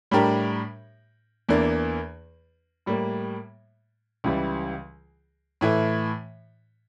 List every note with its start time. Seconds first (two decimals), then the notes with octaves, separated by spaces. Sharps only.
0.11 A2 G3 D4 G4 A#4
1.49 E2 E3 A#3 D4
2.86 A2 G3 A#3
4.24 C#2 C#3 E3 G3
5.61 A2 E3 A3 E4